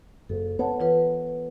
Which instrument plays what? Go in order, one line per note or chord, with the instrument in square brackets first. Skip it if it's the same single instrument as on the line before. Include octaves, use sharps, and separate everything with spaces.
[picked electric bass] F#1 [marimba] A4
[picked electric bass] B3 [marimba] C#5 F#5 A5
[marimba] E3 F4 B4